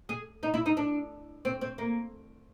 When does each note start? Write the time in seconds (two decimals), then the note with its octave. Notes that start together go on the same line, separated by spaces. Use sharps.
0.09 G#4
0.43 D#4
0.54 E4
0.66 D#4
0.77 D4
1.45 C4
1.61 C4
1.78 A#3